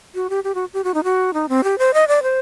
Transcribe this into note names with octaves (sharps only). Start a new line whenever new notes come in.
F#4
G4
G4
F#4
G4
F#4
D#4
F#4
D#4
C4
G4
C5
D#5
D5
C5